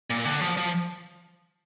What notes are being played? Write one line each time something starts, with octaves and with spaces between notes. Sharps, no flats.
A#2
D3
F3
F3